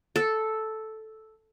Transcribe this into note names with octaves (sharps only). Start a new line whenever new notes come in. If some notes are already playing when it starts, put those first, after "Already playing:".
A4